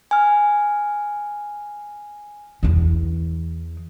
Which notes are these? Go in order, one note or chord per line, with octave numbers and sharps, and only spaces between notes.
G#5 F6
E2 E3